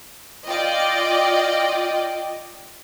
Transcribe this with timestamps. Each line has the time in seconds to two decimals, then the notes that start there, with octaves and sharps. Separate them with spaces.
0.47 F4 D5 D#5 G5